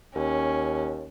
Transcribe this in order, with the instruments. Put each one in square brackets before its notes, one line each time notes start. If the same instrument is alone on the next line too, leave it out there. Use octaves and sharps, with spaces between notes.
[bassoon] D#2 [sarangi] C#4